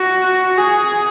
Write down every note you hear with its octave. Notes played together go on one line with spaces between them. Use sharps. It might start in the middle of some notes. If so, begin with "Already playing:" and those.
Already playing: F#4
G#4